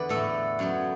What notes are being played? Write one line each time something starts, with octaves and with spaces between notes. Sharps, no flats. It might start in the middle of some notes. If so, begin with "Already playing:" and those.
Already playing: E2 D3 B3 B4 D5
A2 A3 A4
F#2 F#3 B3